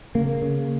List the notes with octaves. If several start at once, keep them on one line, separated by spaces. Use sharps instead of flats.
C#3 A#3
C#3